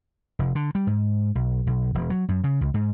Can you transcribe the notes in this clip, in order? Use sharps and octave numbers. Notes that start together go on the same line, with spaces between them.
F1
D3
G3
G#2
B1
B1
E1
F#3
F#2
C#3
C#2
G#2